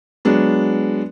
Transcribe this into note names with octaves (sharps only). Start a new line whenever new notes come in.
F#3 G#3 B3 D4